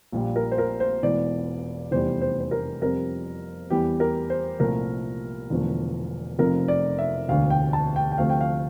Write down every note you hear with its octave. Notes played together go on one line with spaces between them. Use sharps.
A#1 A#2 G3
A#4
C5
A#4
C5
E1 E2 E3 A3 D5
F1 E2 E3 G3 C5
C5
C5
A#4
F2 C3 G3 A#4
E2 E3 G3 G4
A#4
C5
C2 A#2 F3 A3 A#4
E1 E2 D3 F3 A3
F1 F2 C3 F3 A#4
D5
E5
E1 D2 D3 F5
G5
A5
G5
G5
D2 C3 F3 A3 F5
G5
F5